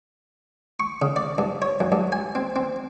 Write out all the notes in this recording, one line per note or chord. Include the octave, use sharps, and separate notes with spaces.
C#6
C#3
D5
G2
C#5
F#2
G2
G#5
C4
C4